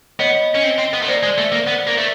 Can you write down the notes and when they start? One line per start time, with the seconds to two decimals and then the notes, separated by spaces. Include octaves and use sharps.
0.20 B3 C#5 D#5
0.55 C#4
0.63 C4
0.78 C4
0.93 B3
1.02 A3
1.08 A#3 C5 D5
1.23 G#3
1.38 A3
1.52 A#3
1.67 B3
1.87 A#3
1.98 A3